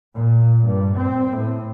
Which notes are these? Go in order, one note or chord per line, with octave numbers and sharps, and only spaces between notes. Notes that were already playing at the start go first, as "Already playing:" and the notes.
A#2
G2
C4
A2